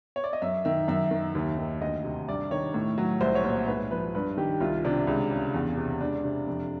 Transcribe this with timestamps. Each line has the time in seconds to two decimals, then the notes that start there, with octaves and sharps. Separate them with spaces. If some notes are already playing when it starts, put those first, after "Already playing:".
0.16 C#5
0.24 D5
0.33 D#5
0.42 F#2 E5
0.65 D#3 E5
0.88 F#2 E5
1.11 D#3
1.35 D#2
1.58 D#3
1.81 D2 D#5
2.04 C3
2.28 G2 D5
2.51 D#3 C#5
2.74 A2
2.98 F#3
3.21 C2 C5
3.35 C#5
3.44 A#2 C5
3.67 G#2 B4
3.91 F3 B4
4.15 G2 B4
4.37 D#3 G4
4.60 C2 F4
4.84 C3 D4
5.07 C#2
5.31 C#3
5.54 E2
5.77 C3
6.00 C#2 D4
6.24 C3
6.47 F2